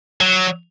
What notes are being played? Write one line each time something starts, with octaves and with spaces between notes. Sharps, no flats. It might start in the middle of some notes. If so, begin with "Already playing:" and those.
F#3